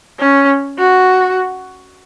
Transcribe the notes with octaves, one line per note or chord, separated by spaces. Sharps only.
C#4
F#4